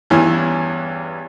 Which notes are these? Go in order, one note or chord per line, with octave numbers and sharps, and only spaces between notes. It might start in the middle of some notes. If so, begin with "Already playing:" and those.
E2 G2 E3 C#4